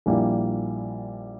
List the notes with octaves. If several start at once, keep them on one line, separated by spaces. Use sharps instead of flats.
A#1 A#2 G3 A#3 E4